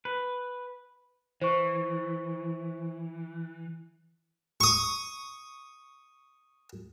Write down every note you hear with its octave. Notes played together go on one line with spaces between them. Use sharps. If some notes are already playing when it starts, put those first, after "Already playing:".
B4
E3 C5 C#6
C#6 D#6